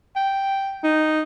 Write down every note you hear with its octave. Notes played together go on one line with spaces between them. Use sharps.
G5
D#4